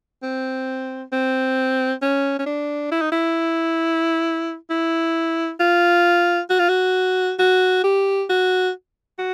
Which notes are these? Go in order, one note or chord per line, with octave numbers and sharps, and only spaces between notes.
C4
C4
C#4
C#4
D4
E4
D#4
E4
E4
F4
F#4
F4
F#4
F#4
G4
F#4
F#4